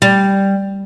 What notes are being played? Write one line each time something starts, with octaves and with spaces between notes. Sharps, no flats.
G3